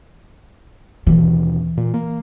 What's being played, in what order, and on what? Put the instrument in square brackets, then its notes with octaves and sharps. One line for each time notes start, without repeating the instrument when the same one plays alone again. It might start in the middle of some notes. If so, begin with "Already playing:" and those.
[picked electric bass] D#2 B2 [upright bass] E3
[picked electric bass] A#2
A#3